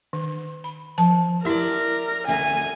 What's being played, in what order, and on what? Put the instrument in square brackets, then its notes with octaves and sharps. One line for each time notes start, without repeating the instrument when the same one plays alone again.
[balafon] D#3
B5
[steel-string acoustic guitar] F3 [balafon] A5
[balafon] E4 G4 [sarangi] A#4 [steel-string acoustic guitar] D5 E5
[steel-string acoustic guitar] D2 C4 E5 [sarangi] G#5